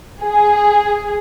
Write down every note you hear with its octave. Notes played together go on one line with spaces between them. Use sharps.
G#4